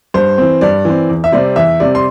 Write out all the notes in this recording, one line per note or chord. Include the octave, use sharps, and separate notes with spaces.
G2 C5
E3 C4
G2 D5
E3 C4
E2
E5
C3 G3 C4 D5
E2 E5
C3 G3 C4 D5
C6